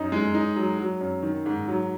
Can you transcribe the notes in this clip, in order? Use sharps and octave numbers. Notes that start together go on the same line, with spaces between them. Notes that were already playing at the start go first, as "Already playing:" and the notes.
Already playing: F#2 D#4
G#3
D#4
F#3
F#3
F#2
D#3
G#2
F#3